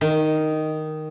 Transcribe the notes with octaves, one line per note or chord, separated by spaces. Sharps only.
D#3